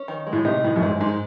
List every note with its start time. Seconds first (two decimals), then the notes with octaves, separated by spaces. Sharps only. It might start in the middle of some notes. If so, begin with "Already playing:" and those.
Already playing: C#4
0.08 D#3
0.27 G#3
0.33 A2
0.45 C3 D#4
0.64 A2 D#3
0.76 F#2
0.83 G#2 G#3
1.01 G#2 G#3